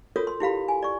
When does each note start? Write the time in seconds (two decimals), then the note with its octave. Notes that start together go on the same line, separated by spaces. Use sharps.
0.16 F4 F#4 A4 A#4 C#5 D#6
0.27 C6
0.40 E4 G4 F5 B5
0.68 G#5
0.83 D5 C#6